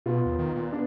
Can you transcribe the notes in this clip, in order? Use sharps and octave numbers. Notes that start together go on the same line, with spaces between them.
B2 B3 F4
D#2
D#3
A#2
B3 D4